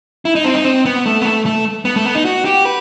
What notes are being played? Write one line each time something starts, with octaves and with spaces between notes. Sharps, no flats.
E4
D#4
C4
D#4
C4
B3
A3
B3
A3
A3
B3
A3
B3
D#4
F#4
G4
B4